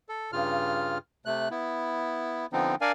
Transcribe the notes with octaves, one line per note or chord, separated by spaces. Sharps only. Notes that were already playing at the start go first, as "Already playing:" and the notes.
A4
G2 C#3 F4 F6
C3 A3 F#6
B3 E4
D3 F3 B3 C4 D#4
D4 A#4 D5 F5 G#5